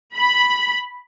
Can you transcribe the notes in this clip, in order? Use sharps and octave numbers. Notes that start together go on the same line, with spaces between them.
B5